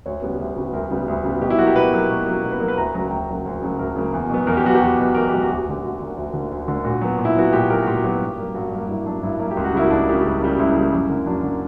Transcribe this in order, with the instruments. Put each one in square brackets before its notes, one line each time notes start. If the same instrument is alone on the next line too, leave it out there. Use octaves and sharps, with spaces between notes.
[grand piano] D2 C#5
C#3 G3 B3
D2
C#3 G3 B3
D2 A#4
C#3 G3 B3
D2
C#3 G3 B3
B2 G4
E4
F#3 A#3 F#4
G4
B2 B4
F#3 A#3
B2
F#3 A#3
B2
B4
F#3 A#3 A#4
B4
D2 A#5
C#3 F#3 A#3 A#5
D2 G5
C#3 F#3 A#3
D2
C#3 F#3 A#3
D2 A#4
C#3 F#3 A#3
E2
B2 F#3 B3
E2 A#4
G4
B2 F#3 B3 F#4
G4
E2
B2 F#3 B3
E2 A#4
B2 F#3 B3 G4
F#4
D2
G4
D3 A#3
D2 F#4
D3 A#3
D2
D3 A#3
D2
D3 A#3
A#2 F#4
F#3 B3
A#2
E4
F#3 B3 F#4
A#2 G4
F#3 B3 A#4
F#4
A#2 G4
F#3 B3
G2
F#3 A#3
G2 F#4
F#3 A#3
G2 E4
F#3 A#3 D4
G2 E4
F#3 A#3
G4
C#2
F#4
C#3 G3 A#3 E4
C#2 D4
C#3 G3 A#3
C#2
C#3 G3 A#3
C#2 E4
C#3 G3 A#3
F#2
D3 A#3
F#2 D4
D3 A#3